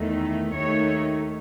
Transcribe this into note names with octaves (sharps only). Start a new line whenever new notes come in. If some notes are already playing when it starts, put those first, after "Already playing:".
Already playing: E2 D#3 A3
D#2 D#3 A3 C#5